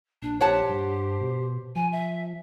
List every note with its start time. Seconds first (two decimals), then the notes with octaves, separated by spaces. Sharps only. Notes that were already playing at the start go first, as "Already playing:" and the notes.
0.22 A#1 D4
0.41 G4 C5 C#5 F#5 A5
0.69 G2
1.21 B2
1.76 F3 G#5
1.92 E5